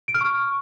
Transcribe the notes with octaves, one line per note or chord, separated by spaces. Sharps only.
D7
F6
C#6